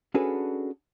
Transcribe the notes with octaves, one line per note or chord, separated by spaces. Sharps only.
C#4 D4 F#4 G#4 A4 B4